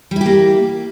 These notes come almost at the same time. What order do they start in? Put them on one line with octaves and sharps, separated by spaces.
G3 E4 G4 A#3